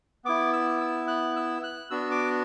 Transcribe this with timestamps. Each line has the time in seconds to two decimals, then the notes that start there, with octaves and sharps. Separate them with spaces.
0.25 B3 E4 D6
0.53 E6
0.81 E6
1.08 F#6
1.36 E6
1.63 F#6
1.91 B3 D4 F#4 E6
2.11 D6